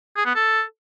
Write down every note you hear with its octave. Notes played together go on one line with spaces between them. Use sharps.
G#4
B3
A4